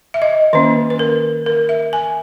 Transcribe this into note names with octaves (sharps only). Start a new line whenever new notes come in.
E5
D#5
D#3 A#3 C#4 B4
B4
A#4
A#4
E5
G#5